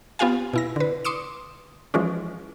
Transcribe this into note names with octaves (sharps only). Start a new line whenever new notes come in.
B3 F4 G4 F5 G#5
B2 E4 A#6
D3 B4
C6 D6 D#6 C#7 E7
E3 F3 G#3 C#4